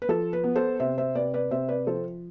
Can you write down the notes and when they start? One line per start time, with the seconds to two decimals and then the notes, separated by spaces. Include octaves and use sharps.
0.02 B4
0.09 F3 A4
0.33 B4
0.44 B3
0.56 A4 C5
0.80 C3 C5 E5
0.98 C5 E5
1.15 C3 B4 D5
1.34 B4 D5
1.51 C3 C5 E5
1.69 B4 D5
1.87 F3 A4 C5